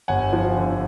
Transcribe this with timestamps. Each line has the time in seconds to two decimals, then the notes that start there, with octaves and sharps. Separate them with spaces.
0.08 G1 F#5 G#5
0.33 F3
0.57 D3